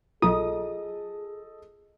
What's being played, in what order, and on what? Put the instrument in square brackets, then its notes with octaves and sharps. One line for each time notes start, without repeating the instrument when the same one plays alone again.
[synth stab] B1 D#6 [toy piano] F4 [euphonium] G#4 [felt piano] A4 D#5